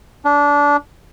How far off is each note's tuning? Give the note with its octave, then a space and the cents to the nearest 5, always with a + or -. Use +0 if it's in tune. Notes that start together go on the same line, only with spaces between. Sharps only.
D4 -20